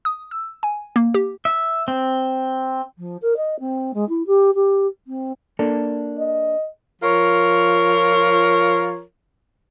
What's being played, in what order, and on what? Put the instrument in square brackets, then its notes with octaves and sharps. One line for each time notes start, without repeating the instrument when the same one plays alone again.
[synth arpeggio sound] D#6
E6
G#5
A#3
G4
[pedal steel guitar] E5
C4
[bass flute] F3
A#4
D#5
C4
G#3
E4
G4
G4
C4
[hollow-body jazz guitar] A#3 D4 A4
[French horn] D#5
[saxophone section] F3 F4 A#4 C#5